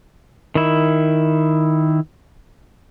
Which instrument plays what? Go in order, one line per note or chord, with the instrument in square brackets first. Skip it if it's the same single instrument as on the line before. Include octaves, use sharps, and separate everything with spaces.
[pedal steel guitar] D#3 E4